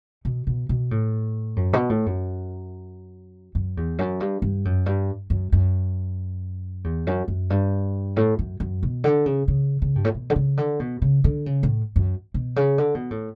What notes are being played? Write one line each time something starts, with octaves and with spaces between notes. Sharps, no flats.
B2
B2
B2
A2
F#2
B2
A2
F#2
F#2
E2
F#2
G2
G2
F#2
G2
F#2
F#2
E2
F#2
F#2
G2
A2
F#2
F#2
B2
D3
C#3
C#3
C#3
G2
A2
B2
D3
C#3
D3
B2
C#3
D3
C#3
A2
F#2
B2
C#3
D3
B2
A2